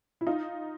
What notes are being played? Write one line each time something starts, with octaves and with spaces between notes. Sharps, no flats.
E4
D#4 F4